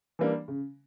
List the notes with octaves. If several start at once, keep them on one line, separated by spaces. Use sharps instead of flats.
E3 G3 A#3 D4
C#3